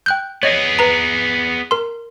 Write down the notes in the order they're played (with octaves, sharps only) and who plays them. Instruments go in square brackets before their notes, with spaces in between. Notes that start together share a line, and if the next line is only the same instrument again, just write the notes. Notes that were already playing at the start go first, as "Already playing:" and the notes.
[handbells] G5 F#6 G6
[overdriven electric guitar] B3 G#4 [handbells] C#5 D#5
[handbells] B4 A#5
A#4 C6